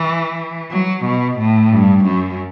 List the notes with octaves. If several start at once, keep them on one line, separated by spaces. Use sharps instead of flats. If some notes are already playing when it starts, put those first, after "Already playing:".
Already playing: E3
F#3
B2
A2
G2
F#2